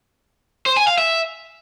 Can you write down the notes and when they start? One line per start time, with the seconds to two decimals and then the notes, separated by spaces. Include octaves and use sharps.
0.66 C5
0.77 G#5
0.87 F5
0.98 E5